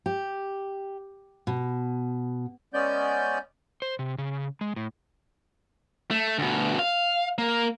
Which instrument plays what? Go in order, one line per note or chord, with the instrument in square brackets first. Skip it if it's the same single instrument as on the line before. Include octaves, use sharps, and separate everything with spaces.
[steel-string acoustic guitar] G4
B2
[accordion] G#3 B3 C#4 D5 G6
[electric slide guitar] C5
C3
C#3
G#3
A2
[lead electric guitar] A3
D2 B2
F5
A#3